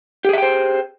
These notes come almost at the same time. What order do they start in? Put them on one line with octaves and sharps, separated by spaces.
G4 G#4 E5 G5 C5